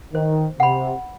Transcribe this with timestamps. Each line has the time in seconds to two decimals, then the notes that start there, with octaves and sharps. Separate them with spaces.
0.14 D#3 C5
0.60 C3 F#5 B5